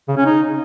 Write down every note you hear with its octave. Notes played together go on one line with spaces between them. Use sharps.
C#3
C#4
D#4